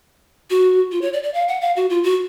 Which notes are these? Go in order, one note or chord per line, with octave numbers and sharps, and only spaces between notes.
F#4
F4
C#5
D5
D5
F5
F#5
F5
F#4
F4
F#4